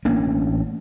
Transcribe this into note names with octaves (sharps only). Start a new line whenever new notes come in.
A1 A#3 C#4 D4